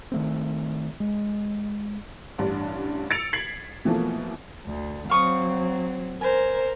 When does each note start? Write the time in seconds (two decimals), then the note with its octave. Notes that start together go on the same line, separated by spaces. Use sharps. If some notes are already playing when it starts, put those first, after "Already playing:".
0.12 D#3 A3 C4
1.00 G#3
2.38 A1 G2 D4
3.10 E6 A6 C#7 D7 F7
3.33 G#6 B6 C7 F#7
3.85 B2 E3 F3 A3 A#3
4.66 D2
5.10 F#3 C4 F5 C#6 D#6
6.21 A#4 C5 G#5